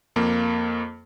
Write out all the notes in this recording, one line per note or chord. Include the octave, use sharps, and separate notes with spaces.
F2 A#3